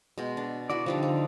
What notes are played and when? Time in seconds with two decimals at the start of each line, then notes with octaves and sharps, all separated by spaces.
0.18 B2 G#3
0.37 D4
0.70 E4 F#4 B4 D5
0.86 D3 F3 G3 D4 D#4
1.03 F3